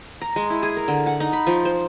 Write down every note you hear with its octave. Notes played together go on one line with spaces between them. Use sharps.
A#5
G#3
E4
G#4
A#4
D3
F#5
D#4
B5
F3
C5